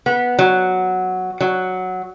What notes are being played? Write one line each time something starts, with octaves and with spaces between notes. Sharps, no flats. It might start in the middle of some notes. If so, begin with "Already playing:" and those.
B3
F#3
F#3